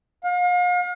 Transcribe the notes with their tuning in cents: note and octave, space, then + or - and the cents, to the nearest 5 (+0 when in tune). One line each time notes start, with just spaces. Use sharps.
F5 +40